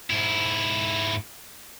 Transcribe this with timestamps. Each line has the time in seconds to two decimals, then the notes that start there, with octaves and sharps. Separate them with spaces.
0.10 G#2 E4